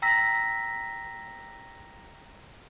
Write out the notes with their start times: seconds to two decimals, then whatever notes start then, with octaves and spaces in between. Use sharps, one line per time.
0.02 G5 A#5 E6 A#6 B6